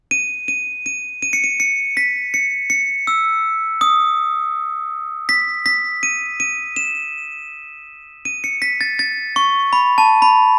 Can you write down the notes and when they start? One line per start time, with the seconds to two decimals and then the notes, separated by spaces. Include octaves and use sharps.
0.11 D#7
0.48 D#7
0.86 D#7
1.22 D#7
1.33 C#7
1.44 D#7
1.60 C#7
1.97 B6
2.34 C#7
2.70 C#7
3.07 E6
3.81 D#6
5.29 B6
5.66 B6
6.03 D#7
6.40 D#7
6.76 E7
8.25 D#7
8.44 C#7
8.62 B6
8.81 A6
8.99 A6
9.36 C#6
9.73 B5
9.98 A5
10.22 B5